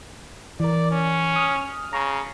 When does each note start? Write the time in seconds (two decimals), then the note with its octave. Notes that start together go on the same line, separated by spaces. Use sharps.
0.60 E3 A#4 D5
0.92 C#4
1.36 D#6 F6
1.93 C#3 A#5 C#6